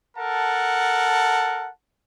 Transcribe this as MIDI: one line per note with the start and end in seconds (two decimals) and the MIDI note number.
0.18 1.69 69
0.18 1.69 70
0.18 1.69 78
0.18 1.69 81